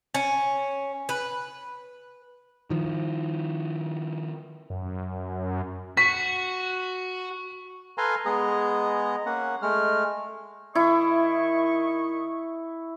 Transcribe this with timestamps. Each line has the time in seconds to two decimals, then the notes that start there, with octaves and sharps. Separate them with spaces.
0.14 C#4
1.09 B4
2.70 D#3 F3
4.70 F#2
5.97 F#4 C#6 B6
7.98 A4 B4 F5 G#5 A#5 C6
8.25 G#3 B3 G#4 D#5 A#5
9.26 A#3 C#4 F#5
9.62 G#3 A3 F6
10.75 D#3 E4 D#5 C#6